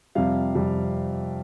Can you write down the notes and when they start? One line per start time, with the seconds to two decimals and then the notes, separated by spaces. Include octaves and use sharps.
0.15 F2 C3 G3 F5
0.55 F2 C3 G3